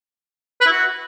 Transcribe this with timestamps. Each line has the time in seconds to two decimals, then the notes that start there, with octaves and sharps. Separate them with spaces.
0.61 B4
0.66 E4
0.72 F#4